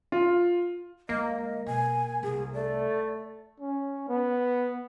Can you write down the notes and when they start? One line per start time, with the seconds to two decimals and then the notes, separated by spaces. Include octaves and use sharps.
0.12 F4
1.09 D2 G#3 A#3 D#5
1.66 B2 G#5
2.23 C2 G#4
2.54 A3 D5
3.60 C#4
4.08 B3